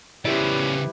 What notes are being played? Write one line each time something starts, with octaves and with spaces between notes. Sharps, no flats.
C#3 E3 C#4 E4 G4 B4 C5 D5